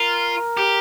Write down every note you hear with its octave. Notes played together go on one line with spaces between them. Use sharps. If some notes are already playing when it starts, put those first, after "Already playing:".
Already playing: F4 A#4
G4